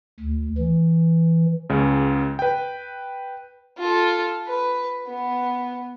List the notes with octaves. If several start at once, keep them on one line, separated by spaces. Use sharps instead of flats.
D2
E3
C#2 C#3
B4 G5
F4 A4
B4
B3